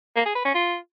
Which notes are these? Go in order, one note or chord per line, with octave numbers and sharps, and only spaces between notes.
A#3
G#4
B4
C#4
F4